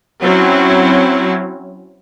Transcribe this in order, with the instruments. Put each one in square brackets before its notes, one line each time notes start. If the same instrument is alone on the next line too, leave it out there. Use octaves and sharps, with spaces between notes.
[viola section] F#3 C4 C#4 E4